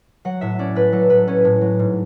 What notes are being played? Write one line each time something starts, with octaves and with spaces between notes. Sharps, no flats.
F#3 F#5
A2 E5
C#4 D5
A2 B4
F#3 A4
A2 B4
C#4
A2
F#3
G#2